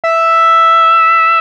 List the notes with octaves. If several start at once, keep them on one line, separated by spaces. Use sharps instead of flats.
E5